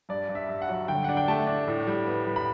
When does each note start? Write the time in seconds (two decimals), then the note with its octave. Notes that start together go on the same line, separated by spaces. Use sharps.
0.09 G2 D5
0.29 G2
0.35 E5
0.49 G2
0.62 F#5
0.69 F#3
0.88 D3 G5
1.04 D4 F#5
1.17 G5
1.28 A3 A5
1.47 D4
1.68 A2
1.87 G3
2.07 B3
2.26 G3
2.36 B5